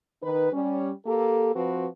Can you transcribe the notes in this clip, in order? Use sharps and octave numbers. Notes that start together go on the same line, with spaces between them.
D#3 D#4 B4
G3 C#4
A#3 G4 A4
F3 C4 F#4 B4